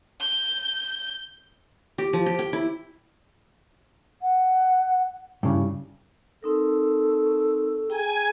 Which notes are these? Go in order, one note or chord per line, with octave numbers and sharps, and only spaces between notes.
G6
G4
F3
G4
G5
E4
F#5
G2 C#3 E4
C4 D#4 A4 A#4
G#4 G5 G#5 A#5